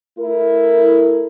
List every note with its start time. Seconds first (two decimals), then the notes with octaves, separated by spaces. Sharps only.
0.19 A3 E4 A#4